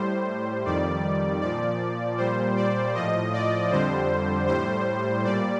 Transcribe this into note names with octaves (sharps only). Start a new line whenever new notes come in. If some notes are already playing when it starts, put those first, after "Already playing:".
Already playing: A2 G3 C5
F2 D#3 G3 D5
A#2 F3 D5
A#2 G3 C5
D5
A2 F3 D#5
D5
F2 D3 G3 C5
A2 G3 C5
A#2 G3 D5